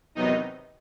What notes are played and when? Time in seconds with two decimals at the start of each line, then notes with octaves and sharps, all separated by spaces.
0.15 E2 C3 D#3 F#3 B3 D#4 D#5